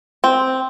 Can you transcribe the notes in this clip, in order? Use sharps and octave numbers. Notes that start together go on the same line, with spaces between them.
C4